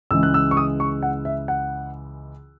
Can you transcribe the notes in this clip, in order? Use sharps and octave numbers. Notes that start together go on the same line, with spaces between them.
C#2 C#3 E3 G#3 E6
F#6
E6
C#6
D#6
C#6
F#5
E5
F#5